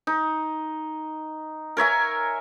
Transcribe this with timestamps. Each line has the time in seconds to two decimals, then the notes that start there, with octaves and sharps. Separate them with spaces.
0.07 D#4
1.77 A#4 C#5 E5 G#5